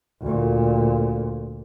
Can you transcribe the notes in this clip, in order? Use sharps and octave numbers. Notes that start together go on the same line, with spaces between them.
D2 A#2